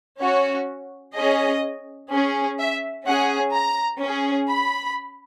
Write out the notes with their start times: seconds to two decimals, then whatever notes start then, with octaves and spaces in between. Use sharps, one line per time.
0.21 C#4 F#4 C#5
1.16 C#4 G#4 D#5
2.12 C#4 G#4
2.60 E5
3.07 C#4 G#4 F#5
3.54 A#5
4.01 C#4 G#4
4.49 B5